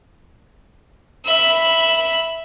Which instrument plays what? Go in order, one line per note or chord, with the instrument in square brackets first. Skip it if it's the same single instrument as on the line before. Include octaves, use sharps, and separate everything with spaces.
[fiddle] E5 B5